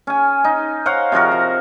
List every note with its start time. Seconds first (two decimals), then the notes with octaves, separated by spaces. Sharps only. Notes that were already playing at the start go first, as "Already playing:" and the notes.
0.07 C#4 G#5
0.44 D#4
0.86 C5 C#5 F5 F#5
1.12 C3 F3 F#4 A#4
1.32 F#4